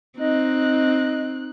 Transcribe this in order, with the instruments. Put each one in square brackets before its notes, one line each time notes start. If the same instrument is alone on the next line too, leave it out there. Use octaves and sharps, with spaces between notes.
[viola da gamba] C4 [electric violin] D#4 F#6 [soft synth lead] D#5